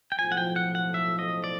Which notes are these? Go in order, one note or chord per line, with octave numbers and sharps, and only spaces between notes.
G5
B1 A2 F3 G#5
F#5
G5
F#5
F#5
E5
D#5
D5